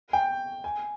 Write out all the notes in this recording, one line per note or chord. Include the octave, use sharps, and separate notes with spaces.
G5
G#5